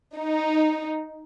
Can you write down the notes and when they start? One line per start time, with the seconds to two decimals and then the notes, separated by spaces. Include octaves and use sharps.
0.17 D#4